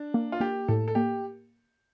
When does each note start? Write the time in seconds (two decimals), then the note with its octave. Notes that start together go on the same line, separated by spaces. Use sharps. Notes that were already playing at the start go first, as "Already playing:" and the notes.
Already playing: D4
0.14 A#3
0.32 F4
0.40 A#3 G4
0.68 A2 A4
0.88 A4
0.95 A#3 G4